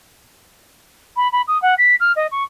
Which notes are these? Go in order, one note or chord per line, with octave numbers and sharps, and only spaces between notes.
B5
B5
D#6
F#5
B6
F6
D#5
C#6